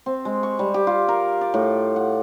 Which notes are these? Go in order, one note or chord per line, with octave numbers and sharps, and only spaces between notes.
C4
G#3
C#6
G3
G4
F4
A#4
D5
A2
F#5